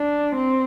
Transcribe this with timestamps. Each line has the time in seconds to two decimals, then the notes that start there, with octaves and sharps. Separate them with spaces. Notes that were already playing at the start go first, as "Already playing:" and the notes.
Already playing: D4
0.36 C4